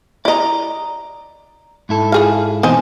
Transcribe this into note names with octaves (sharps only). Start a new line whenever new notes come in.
E4 D5 D#5 A#5
G#2 E4 A4
F4 G#4 F5
B2 E3 C4 D#4 C5 G#5